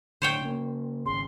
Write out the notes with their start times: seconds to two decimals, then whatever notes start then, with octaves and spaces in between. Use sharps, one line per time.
0.22 A2 D3 C5 C#5 G5
0.41 C#3 A#3
1.06 G#1 C#3 C6